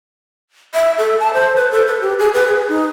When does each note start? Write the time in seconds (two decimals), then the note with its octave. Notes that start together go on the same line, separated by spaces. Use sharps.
0.74 E5
0.98 A4
1.20 A5
1.34 C5
1.56 B4
1.71 A4
1.87 B4
2.01 G4
2.19 G#4
2.34 B4
2.47 G#4
2.69 D#4